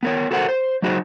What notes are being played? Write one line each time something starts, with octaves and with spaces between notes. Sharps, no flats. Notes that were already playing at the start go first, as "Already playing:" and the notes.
B3 A#4 C#5
F#4 A4 A#4 C5 F#5
C5
F#3 A3 D#4 F#4 G#4 C5